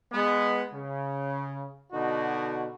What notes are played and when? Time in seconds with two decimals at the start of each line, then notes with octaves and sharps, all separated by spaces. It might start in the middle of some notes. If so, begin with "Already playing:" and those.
0.12 G#3 B3
0.72 C#3
1.92 B2 D3 D#4 F#4